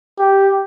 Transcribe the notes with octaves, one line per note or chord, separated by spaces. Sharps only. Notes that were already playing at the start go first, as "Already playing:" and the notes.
G4